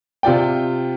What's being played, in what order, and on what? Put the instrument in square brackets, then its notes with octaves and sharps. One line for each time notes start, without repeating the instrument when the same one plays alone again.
[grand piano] C3 F4 D5 G5